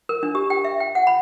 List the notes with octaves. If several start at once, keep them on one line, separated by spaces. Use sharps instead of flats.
A#4
D4
G4
G5
E5
G5
F#5
B5